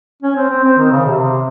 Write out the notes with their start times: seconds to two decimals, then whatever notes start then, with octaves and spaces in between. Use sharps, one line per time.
0.22 C#4
0.36 C4
0.49 C4
0.64 C4
0.78 D#3
0.91 C#3
1.06 C3